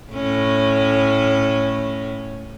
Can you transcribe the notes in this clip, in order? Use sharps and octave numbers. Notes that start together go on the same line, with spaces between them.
A2 C#4